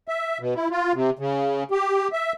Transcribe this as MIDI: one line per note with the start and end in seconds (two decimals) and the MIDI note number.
0.08 0.38 76
0.40 0.54 47
0.55 0.68 64
0.71 0.93 65
0.94 1.10 48
1.19 1.64 49
1.71 2.08 67
2.12 2.33 76